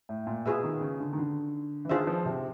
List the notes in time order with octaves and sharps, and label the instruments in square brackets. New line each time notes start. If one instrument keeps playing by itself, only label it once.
[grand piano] A2
A#2
[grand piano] B2 [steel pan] F4 G#4 B4 E5
[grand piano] D#3
C#3
D3
D#3
D3
E3
[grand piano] D#3 [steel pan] D4 F4 G#4 C5 E5
[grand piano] F3
C3